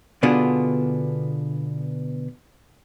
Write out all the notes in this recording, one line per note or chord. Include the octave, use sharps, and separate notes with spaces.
B2 D3 B3 D4 F4 G#4